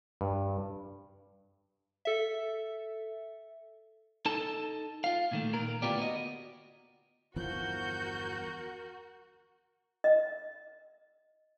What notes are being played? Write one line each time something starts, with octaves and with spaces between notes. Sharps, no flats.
G2
A4 E5
D#4 A4 A5
F4 F5
A#2 D#3 A3
A#2 D#3 A#4
D2 A2 B3 F4 G4 D5
F#4 D#5
G1 E2 F3 F#4 A#4 G6
D#5